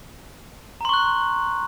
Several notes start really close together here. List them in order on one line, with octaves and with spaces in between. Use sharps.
A#5 C6 C#6 F#6